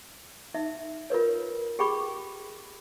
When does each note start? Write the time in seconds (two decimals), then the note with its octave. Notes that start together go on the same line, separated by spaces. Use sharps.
0.54 D#4 E5
1.10 F4 A#4 B4 C#5
1.79 G4 G#4 G5 B5 C#6 D6